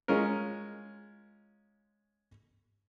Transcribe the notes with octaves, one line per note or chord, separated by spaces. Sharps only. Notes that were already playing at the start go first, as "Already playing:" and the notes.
G#3 C#4 F4 A#4